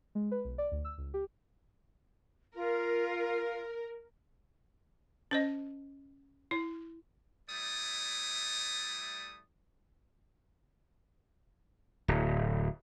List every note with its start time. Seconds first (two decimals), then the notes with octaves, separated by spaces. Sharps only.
0.15 G#3
0.31 B4
0.45 B1
0.58 D5
0.72 D2
0.85 E6
0.98 C#2
1.14 G4
2.55 F4 A#4
5.31 C#4 C5 D#5
6.51 E4
7.49 G3 A3 E4 D5 D#6
12.08 D1